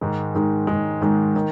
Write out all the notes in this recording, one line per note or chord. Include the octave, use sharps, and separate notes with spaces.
G#2 D#3 G#3
G#2 D#3 G#3
G#2 D#3 G#3
G#2 D#3 G#3
D#3